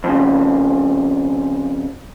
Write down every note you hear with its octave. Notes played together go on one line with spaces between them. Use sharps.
F2 C#3